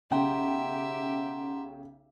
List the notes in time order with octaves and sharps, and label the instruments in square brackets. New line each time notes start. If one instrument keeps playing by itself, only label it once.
[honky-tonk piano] B1 C#3 G5 [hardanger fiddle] G4 E5 [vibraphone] F#5 A#5 C6